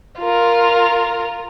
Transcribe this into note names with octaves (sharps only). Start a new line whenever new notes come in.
F4 A#4